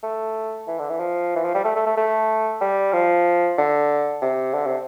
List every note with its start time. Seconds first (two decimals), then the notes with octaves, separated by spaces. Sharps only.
0.03 A3
0.68 E3
0.79 D3
0.90 E3
1.00 F3
1.36 E3
1.45 F3
1.55 G3
1.64 A3
1.76 A3
1.86 A3
1.97 A3
2.61 G3
2.93 F3
3.58 D3
4.22 C3
4.54 D3
4.66 C3